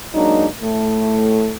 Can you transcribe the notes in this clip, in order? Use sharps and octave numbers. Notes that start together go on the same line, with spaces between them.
F#3 G#3 A#3 D4 D#4
A2 A3